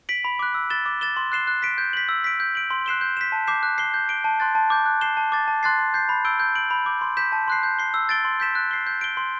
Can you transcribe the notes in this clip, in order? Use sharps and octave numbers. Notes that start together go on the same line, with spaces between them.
B6 D7 F#7
B5
D6 F#6
E6
A6 E7 G7
D6
A6 E7 G7
C6
F#6 C7 E7 G7
F#6
B6 D7
G6
B6 F#7
E6
B6 D7
G6
D7 F#7
C6
F#6 C7 E7 G7
G6
B6 E7
A5
D6 G6 C7 E7
F#6
C7 G7
G6
D7 G7
A5
C6 F#6 A6
A5
D6 G6
F#6
C7 E7 G7
A5
D6 A6
A5
C6 F#6 A6 C7
C6
G6 C7
B5
E6 G6 D7 G7
G6
D7 F#7
B5
D6 G6
C6
G6 B6 E7
A5
C6 F#6 C7
G6
C7 G7
E6
A6 D7 G7
C6
G6 B6 E7
F#6
C7 G7
G6
D7 G7
C6